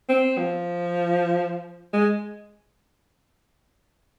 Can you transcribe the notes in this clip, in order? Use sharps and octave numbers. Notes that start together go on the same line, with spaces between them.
C4
F3
G#3